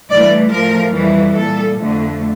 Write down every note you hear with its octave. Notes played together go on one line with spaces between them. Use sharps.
G2 E3 A3 D5
A2 F3 A3 A#4
F2 E3 G3
A#2 G3 A4
F2 D3 A3